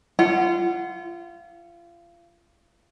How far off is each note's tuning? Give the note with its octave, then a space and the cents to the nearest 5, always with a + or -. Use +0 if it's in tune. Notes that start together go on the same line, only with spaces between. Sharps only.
F4 -30 F#5 +0